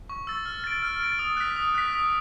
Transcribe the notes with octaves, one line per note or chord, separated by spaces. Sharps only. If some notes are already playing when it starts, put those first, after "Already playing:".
C#6
E6 A6
F6
A6 D7
F6
A6 D7
D#6
F#6 B6
D#6
F#6 B6
D#6